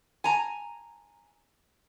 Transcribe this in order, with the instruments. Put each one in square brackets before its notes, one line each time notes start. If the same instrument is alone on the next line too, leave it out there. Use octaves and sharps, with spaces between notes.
[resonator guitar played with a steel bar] G#5 A#5